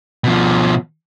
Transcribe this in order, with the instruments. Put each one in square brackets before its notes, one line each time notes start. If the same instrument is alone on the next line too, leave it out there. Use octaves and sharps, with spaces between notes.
[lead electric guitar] B2 F3